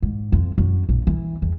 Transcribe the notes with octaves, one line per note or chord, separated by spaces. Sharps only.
G#2
F2
F#2
A#1
E3
E2